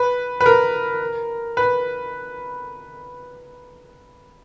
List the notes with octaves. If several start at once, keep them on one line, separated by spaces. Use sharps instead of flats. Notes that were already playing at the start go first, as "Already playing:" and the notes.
Already playing: B4
B4
A#4
B4